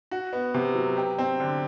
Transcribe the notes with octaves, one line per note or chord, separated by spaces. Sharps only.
F#4
B3
C3
F#3
G4
C4
D3